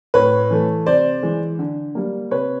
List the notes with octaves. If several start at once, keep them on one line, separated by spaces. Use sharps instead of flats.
A2 B4 C#5
E3 A3
C3 C5 D5
E3 G#3
D3
G3 A#3
C3 B4 C#5